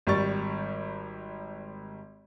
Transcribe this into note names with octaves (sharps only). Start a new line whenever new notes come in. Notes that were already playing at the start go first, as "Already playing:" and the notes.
G#1 G3 G4 C#6 A6